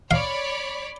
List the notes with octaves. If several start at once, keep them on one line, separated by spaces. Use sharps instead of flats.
C#5 D5 F5 B5